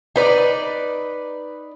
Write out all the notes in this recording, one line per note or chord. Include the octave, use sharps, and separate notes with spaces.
D#4 B4 D5